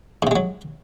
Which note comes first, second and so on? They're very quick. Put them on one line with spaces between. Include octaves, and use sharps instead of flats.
G#2 C3 G#3 F#3